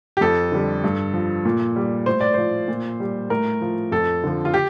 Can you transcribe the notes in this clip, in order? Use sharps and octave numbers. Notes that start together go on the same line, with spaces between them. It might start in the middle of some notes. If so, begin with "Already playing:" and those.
G4
F2 A4
D3 G3
G2
F3
A#2
G3
A2 C5
D5
F3 C5
A#2
G3
A2 A#4
F3
F2 A4
D3 F3
F4
G4